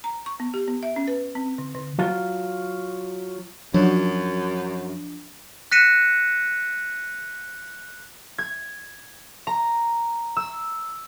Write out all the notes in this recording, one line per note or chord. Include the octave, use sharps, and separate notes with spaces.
A#5
C#6
B3
G4
B3
E5
C#4
B4
C4
D3
D3
F#3 F4
F#2 F3 F#3 D4
F#6 A#6 B6 C#7 D#7 E7
G#6
A#5
E6